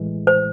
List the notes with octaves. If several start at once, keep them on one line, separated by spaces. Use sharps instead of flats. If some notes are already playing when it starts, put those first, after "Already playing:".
Already playing: A1 A2 E3 G#3
C5